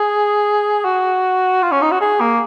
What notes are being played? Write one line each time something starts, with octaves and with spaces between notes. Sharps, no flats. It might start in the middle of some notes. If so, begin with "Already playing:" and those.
Already playing: G#4
F#4
F4
C#4
D#4
F#4
G#4
A#3